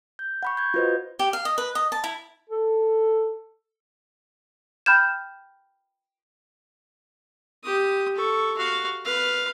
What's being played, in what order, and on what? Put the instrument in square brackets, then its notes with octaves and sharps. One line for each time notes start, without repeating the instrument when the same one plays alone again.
[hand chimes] G6
F#5 B5 C#6
G6 G#6
F4 F#4 B4 C5 D#5
[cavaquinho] G4
F5
D#5
B4
D#5
A5
E4
[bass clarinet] A4
[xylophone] G5 B5 F6 G6 G#6 E7
[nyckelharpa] G4 D#6
A4 C#6
F#4 F5
B4 F5